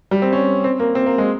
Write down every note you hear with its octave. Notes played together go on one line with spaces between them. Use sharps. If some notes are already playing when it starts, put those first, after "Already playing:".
G3
C4
C#4
C4
A#3
C4
A#3
G#3